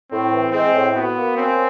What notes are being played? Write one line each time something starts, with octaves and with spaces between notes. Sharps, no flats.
A2 C4
E3
G#3 C4
A2
B3 F#4
A#3
C4 C#4